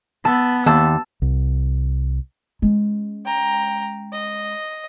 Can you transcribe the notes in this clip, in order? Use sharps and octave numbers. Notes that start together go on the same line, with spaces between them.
B3 A5 E6
D#2 A5 E6
C2
G#3 C#4
G5 A#5
D#5